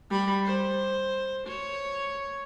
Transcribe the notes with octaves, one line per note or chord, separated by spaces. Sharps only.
G3 B5
C5
C#5